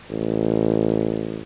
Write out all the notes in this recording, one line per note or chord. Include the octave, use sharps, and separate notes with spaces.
A1